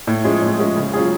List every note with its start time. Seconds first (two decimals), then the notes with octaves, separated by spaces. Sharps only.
0.07 A2
0.24 F3 G#3 C#4 G#4
0.42 A2
0.59 F3 G#3 C#4 G#4
0.77 C#3
0.93 F#3 C#4 F4 G#4